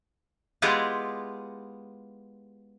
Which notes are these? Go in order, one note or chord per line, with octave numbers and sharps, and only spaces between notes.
G#3 B3 E4 F4 G4 G#4